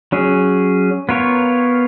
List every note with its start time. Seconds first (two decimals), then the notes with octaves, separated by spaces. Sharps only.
0.12 F#3 C#4 G#4
1.09 B3 F4 A#4 C#5